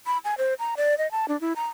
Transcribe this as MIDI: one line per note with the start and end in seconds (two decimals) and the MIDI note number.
0.07 0.18 83
0.25 0.34 80
0.38 0.54 72
0.59 0.75 82
0.77 0.98 74
0.98 1.10 75
1.12 1.26 81
1.28 1.39 62
1.41 1.53 64
1.56 1.67 82